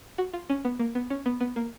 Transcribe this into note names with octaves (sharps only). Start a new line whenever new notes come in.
F#4
F4
C#4
B3
A#3
B3
C#4
B3
B3
A#3